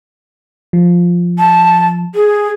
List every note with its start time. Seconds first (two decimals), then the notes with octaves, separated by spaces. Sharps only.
0.73 F3
1.39 A5
2.15 G#4